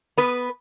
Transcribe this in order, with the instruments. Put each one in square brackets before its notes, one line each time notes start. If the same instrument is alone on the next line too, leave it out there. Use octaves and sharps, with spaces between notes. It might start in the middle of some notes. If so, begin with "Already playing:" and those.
[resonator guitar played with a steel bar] B3 B4